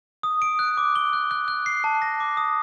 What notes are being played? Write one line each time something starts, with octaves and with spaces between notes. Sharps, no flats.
D#6
D7
F#6
D6
G7
F#6
F#6
F#6
C7
A5
A#6
D6
D#6